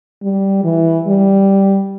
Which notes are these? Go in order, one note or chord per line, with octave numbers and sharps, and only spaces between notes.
G3
E3
G3